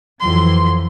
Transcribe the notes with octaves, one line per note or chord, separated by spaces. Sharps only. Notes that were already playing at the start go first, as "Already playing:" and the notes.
F2 E3 F#3 C6